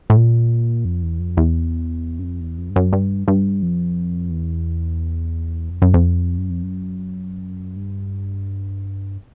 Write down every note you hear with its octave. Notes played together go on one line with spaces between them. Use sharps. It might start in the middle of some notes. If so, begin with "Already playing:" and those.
A2
A#2
F2
E2
F2
E2
F#2
F2
E2
F2
G2
F#2
G2
G2
F2
E2
F2
F#2
F2
F#2
F2
F#2
G2